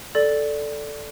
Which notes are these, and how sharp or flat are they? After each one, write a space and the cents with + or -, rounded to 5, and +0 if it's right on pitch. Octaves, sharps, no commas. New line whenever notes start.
A4 +0 D5 +0